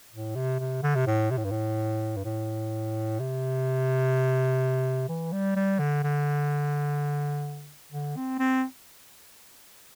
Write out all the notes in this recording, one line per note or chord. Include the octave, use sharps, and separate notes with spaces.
A2
C3
C3
D3
C3
A2
C3
A2
G2
A2
G2
A2
C3
E3
G3
G3
D3
D3
D3
C4
C4